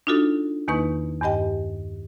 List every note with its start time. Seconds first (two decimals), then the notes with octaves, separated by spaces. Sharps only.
0.07 D4 D#4 F4 F#4 A4
0.68 E2 D#3 A#3 D#4 B4 C#6
1.21 E2 G2 G4 D#5 G5